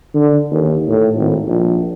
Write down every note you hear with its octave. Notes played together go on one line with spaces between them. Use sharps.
D3
D#2
A2
G#1
A#1